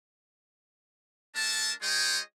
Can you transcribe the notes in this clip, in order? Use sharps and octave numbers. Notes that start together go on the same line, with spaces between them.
A3 D4 A#4 A5
G#3 F4 G#4 C#5 D#5 G5